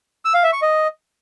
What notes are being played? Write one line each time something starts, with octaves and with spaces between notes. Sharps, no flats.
E6
F5
E5
C#6
D#5